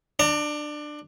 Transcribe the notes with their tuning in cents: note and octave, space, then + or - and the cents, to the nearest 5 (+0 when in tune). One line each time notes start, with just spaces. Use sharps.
D4 +20 A#5 -35